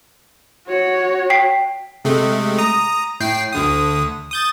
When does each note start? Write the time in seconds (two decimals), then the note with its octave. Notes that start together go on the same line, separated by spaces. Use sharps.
0.67 F#4 C#5
1.30 G5 B6 C7
2.05 C3 G#3 A3
2.59 A#5 D#6
3.20 A2 G5 C7
3.53 D2 D3 D#6
4.31 D#6 G6 A6